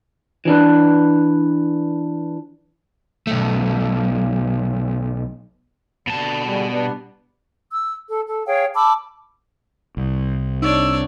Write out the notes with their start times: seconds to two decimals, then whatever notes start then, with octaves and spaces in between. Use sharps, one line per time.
0.45 E3 D4 B4
3.27 B1 A3
6.07 B2 D3 A5
6.45 D3 G3 G#3
6.70 G3 B3 D4
7.72 E6
8.07 A4
8.26 A4
8.46 G#4 C#5 F5 G5
8.74 A5 B5 D6 E6
9.97 C2
10.62 D4 D#4 C#5 D5 E6